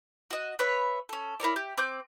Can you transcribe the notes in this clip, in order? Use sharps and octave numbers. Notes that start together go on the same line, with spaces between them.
F#4 D#5
B4 C#5 E5
C#4 A4
E4 A#4 C#5 D5
G4
C4 D6 G6